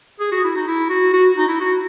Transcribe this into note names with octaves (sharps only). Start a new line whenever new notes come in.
G#4
F#4
E4
D#4
E4
F#4
F#4
D#4
E4
F#4